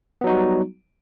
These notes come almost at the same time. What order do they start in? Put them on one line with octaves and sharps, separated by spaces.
B3 F#3 D#4 F#4 G3